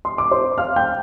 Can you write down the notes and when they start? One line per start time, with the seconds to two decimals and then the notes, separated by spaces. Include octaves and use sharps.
0.05 C6
0.18 D6
0.31 C5 C6
0.58 F5 F6
0.76 G5 G6